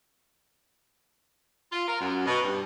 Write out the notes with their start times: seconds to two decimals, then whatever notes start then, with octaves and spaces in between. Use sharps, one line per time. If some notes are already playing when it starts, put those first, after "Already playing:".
1.72 F4
1.88 A#4
2.01 F#2
2.26 B2
2.44 G2